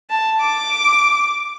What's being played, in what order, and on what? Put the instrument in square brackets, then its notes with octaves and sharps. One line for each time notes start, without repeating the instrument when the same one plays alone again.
[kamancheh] A5
D6